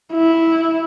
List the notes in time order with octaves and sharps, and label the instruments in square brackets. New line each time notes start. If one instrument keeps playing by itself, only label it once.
[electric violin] E4